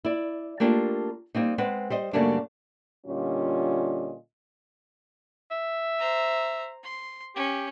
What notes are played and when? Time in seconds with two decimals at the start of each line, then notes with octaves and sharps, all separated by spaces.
0.05 E4 D5
0.60 A3 A#3 D4 F4 G4
1.35 G3 A#3 C4 D#4
1.58 G#3 C4 B4 F#5
1.90 G3 C5 D#5
2.13 F#2 C#3 G3 A3 A#3 D4
3.07 A#2 D3 G3 C#4 F4 D#5
5.51 E5
5.99 C5 A#5
6.84 C6
7.36 C#4 G4